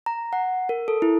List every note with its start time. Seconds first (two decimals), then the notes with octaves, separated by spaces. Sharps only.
0.06 A#5
0.33 F#5
0.69 A#4
0.88 A4
1.02 E4